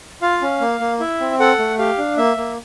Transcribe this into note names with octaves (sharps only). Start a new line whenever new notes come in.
F4 F5
C#4
A#3
A#3
E4 E5
C4
A4 F#5
A3
G4 F5
D4
A#3 E5
A#3